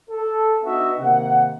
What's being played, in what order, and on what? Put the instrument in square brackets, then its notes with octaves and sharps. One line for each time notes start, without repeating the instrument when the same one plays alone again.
[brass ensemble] A4
B3 D4 D#4 F#4 D#5 E5
C3 D#3 A#3 F#5